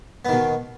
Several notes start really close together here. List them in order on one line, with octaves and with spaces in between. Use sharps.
B3 D#3 B2